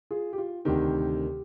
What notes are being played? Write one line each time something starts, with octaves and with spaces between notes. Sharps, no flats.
F4 G#4
G4
F4
D2 C3 D#3 G4